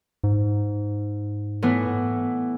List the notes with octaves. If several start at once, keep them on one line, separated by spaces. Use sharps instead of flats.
G#2
A2 E3 B3